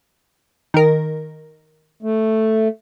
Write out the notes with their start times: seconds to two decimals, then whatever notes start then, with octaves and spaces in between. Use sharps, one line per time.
0.74 D#3 A#4
2.03 A3